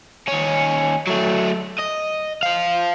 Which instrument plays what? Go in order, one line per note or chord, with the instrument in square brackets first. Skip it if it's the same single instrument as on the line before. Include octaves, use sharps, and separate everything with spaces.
[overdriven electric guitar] D#2 C#4
F#3 A3
D#5
C5 F5